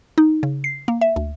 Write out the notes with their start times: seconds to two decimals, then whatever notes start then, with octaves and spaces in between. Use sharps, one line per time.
0.18 D#4
0.43 C#3
0.64 C7
0.88 A#3
1.01 E5
1.16 D2